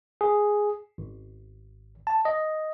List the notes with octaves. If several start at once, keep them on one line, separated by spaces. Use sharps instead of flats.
G#4
G#1
A5
D#5